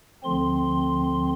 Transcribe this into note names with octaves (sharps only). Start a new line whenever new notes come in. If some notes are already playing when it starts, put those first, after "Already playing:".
D2 D3 F3 C4 C6